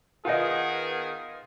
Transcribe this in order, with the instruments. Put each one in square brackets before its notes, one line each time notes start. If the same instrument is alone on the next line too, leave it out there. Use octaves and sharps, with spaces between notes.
[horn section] D#3 B3 G#4 [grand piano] F4 D#5